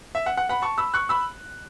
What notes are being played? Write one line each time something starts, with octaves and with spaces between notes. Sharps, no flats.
E5
F#5
F#5
F#5 B5
A5 C#6
B5 E6
C#6 F#6
B5 E6